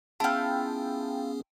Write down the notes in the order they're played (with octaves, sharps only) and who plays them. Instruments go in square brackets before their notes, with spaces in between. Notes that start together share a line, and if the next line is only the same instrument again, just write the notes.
[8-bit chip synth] B3 C#4 G#4 [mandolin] E4 F4 [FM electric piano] G5 A5